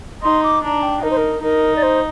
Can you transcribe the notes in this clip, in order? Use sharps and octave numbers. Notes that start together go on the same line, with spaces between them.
D#4 C6
D6
D4 A#5
G5
D#4 A#4
C5
A#4
D#4 A#4
D5
C5